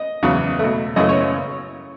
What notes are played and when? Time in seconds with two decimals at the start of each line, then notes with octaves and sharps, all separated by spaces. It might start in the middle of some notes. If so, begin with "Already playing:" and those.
Already playing: D#5
0.23 E2 C#3 F#3
0.59 B2 A3
0.96 F#2 C#3 E3 A3 D#5
1.09 C#5
1.21 C#5